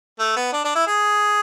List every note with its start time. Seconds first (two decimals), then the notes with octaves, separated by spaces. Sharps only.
0.19 A3
0.36 B3
0.53 D4
0.64 D4
0.75 E4
0.87 G#4